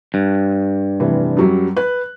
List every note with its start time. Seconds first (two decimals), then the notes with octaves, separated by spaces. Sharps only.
0.14 G2
1.00 F1 E3
1.37 F#2 F#3 G3
1.76 B4 F#6